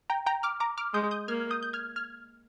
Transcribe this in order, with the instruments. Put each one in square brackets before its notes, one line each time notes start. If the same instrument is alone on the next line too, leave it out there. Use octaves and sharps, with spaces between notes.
[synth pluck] G5 A#5
G5 A#5
D6 F6
A#5 D6
D6 F6
[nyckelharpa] G#3 [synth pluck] D#6 G6
[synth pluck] D#6 G6
[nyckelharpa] A#3 [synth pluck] F6 G#6
[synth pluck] D#6 G6
G6
F6 G#6
F6 G#6